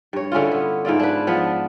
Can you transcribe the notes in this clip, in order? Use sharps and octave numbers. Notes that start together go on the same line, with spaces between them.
G2 C#5
D3 C#4 E4 F4
B3
G#2 E4 F4 D5
D4 B4
F3 B3 D4